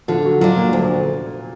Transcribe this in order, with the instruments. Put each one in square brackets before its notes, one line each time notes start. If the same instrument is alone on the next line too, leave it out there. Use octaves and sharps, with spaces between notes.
[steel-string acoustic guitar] D3 [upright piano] F3 F4
[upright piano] F#3 F#4
[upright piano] F3 F4 [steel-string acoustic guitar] F#3 D4
[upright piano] A#2 A#3
[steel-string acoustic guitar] D2